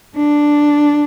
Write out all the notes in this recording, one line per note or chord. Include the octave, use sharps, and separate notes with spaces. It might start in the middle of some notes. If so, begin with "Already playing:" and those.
D4